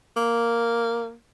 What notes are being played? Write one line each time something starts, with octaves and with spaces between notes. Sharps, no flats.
A#3